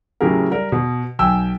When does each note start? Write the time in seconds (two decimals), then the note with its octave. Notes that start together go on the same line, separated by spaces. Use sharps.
0.21 A2 C#3 F#3 G4 G#4 A#4
0.51 G3 A#4
0.72 B2
1.19 B1 G5 G#5 E6